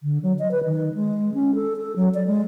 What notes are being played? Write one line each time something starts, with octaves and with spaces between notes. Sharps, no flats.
D3
F#3
D#5
B4
D#3
G#3
C#4
A4
A4
F#3
D5
G#3